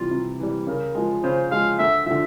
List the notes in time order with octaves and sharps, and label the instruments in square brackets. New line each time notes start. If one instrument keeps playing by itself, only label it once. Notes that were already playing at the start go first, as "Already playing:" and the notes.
Already playing: [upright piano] C3 E3 G3 [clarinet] F4
[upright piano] C3
E3 G3
[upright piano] C#3 [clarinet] A#4
[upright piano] F3 G#3
[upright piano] C#3 [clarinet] C5
[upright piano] F3 G#3 [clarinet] F5
[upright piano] D2 [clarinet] E5
[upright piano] D3 F3 [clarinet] E5